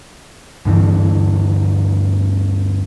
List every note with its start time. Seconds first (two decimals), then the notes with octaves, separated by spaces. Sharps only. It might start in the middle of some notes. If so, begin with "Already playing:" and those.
0.65 D2 G2 D3 E3